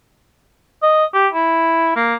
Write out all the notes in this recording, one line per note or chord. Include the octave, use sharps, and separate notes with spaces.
D#5
G4
E4
A#3